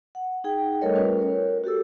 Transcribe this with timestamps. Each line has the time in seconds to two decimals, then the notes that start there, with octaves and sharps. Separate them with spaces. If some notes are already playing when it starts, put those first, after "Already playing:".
0.15 F#5
0.44 D#4 G#4 G5
0.81 G3 A3 A4 A#4 C#5 D#5
0.96 C#4 F4 A#4 B4
1.20 A#4 C#5
1.64 F#4 G4 A4 E6